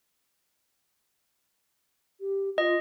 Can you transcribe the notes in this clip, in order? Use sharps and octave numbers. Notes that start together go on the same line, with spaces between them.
G4
F4 D#5